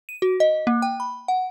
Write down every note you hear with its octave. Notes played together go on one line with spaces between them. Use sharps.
D#7
F#4
D#5
A#3
G5
B5
F#5